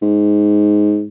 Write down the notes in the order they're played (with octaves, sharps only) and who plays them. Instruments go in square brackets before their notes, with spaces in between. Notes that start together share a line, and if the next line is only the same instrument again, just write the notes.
[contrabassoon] G#2